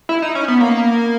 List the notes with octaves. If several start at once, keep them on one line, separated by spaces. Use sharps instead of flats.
E4
D#4
C#4
B3
A#3